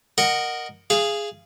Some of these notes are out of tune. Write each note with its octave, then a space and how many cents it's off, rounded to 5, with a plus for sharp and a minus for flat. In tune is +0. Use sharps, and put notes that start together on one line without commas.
A#4 +0 D#5 -15 F#5 +0
G#4 +0 F5 -25